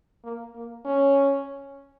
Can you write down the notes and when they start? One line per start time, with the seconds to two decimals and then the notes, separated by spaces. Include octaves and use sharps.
0.24 A#3
0.55 A#3
0.85 C#4